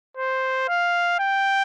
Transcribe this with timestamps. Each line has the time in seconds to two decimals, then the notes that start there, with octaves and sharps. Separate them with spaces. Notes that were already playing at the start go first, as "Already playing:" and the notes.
0.17 C5
0.69 F5
1.20 G5